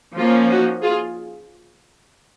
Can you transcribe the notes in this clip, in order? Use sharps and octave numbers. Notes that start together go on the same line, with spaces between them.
F3 A#3 C#4 F4
D#4 F#4
F4 G#4